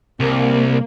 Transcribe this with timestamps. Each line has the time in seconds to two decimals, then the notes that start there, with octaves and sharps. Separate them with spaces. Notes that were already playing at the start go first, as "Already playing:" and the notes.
0.20 C2 A#3